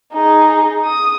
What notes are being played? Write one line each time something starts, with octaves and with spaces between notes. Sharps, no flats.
D#4 G#4
D#6